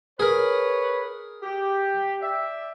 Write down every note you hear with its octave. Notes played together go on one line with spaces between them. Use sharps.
G#4 A#4 B4 C#5
G4
D5 E5 G5